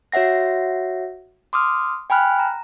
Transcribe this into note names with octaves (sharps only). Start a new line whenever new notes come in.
F#4 C#5 E5 F#5 A#6
C6 D6 D#6 F6
G5 G#5 B5 F6 F#6
A#5